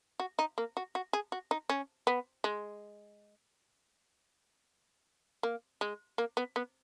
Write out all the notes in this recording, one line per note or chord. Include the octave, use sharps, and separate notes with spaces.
F#4
D#4
A#3
F#4
F#4
G#4
F#4
D#4
C#4
B3
G#3
A#3
G#3
A#3
B3
B3